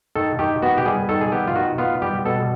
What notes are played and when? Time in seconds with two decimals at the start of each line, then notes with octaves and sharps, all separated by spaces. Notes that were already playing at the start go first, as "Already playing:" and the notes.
0.16 D#3 A4
0.39 D#3 G4
0.62 B3 F#4
0.77 G4
0.85 G3 G#4
1.09 D#3 A4
1.21 G#4
1.32 B3 G4
1.47 F4
1.55 D#3 F#4
1.78 B3 F4
2.02 G3 G4
2.25 B2 A4